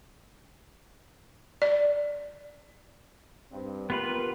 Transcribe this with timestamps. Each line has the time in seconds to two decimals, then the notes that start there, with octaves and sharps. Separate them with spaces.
1.62 D5
3.52 G2 C4
3.90 B3 F4 G4 A#4 B4